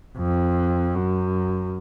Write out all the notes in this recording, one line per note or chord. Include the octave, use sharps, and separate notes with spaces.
F2
F#2